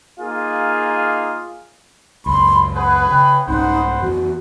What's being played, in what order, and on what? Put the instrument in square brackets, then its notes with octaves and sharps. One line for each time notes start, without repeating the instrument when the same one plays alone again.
[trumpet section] A#3 D#4 F4 G#4 F5
[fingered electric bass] C#2 F#2 [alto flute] B5 [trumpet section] C6
[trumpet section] G#4 B4 [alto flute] F#5
[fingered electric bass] C#3 [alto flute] G5
[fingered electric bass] C2 G#2 C#4 [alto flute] D#4 [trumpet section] C5 F#5 B5
[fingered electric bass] F2 E3 [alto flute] F#4